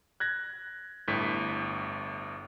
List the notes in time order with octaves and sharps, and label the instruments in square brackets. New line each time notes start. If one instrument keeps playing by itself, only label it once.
[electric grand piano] F#6 G#6 A#6
G1 A2 B6